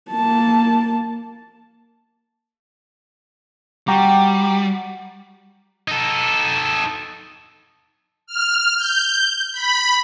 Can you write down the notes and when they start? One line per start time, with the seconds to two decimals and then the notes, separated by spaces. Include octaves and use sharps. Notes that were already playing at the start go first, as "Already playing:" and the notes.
0.11 A#3 A5
3.88 G3 F#4 G5 A#5 D6
5.88 D#4 A4
8.26 F6
8.76 G6
9.52 B5